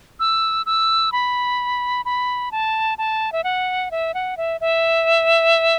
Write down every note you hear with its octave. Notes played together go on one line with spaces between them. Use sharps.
E6
E6
B5
B5
A5
A5
E5
F#5
E5
F#5
E5
E5